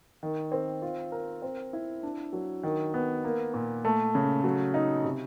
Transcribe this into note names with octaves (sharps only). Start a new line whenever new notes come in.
D#3
C4
F4
A#4
C4
E4
D4
F#3
D#3
B3
A#3
A#2
A3
C#3
F#3
D#4
C3